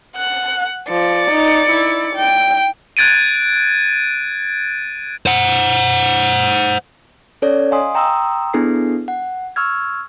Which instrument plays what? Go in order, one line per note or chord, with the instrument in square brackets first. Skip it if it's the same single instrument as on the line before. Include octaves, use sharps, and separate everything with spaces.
[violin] F#5 F#6
[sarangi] F3 [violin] D5 C#7
[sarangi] D#4
E4
G5
[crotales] F#6 G#6 A6 D7 D#7
[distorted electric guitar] C5 F#5
[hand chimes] C#4 A4 C#5 D5
D#5 F5 G#5 C6 D#6
G5 A#5 C6 D#6 E6
B3 D4 E4 G#4 A4 C7
F#5
C#6 E6 F6 G#6